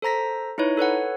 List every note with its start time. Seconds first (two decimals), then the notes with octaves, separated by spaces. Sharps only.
0.02 A4 C5 A#5 A#6 B6
0.58 D#4 E4 B4 C#5
0.77 A4 B4 C#5 F#5